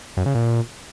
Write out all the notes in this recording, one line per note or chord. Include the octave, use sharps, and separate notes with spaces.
F#2
C#3
A#2